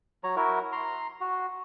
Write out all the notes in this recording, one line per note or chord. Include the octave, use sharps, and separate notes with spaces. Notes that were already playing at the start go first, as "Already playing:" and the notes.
F#3 C#5 A#5
E4 F#4 A#4
A#5 C6
F#4